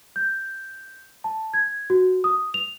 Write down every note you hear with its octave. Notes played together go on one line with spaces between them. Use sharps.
G6
A5
G#6
F#4
D#6
F7